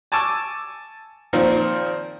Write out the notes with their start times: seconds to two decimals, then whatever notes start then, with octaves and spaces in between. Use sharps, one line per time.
0.12 G#5 A5 C#6 D6 E6
1.33 A#2 D#3 F3 A#3 C4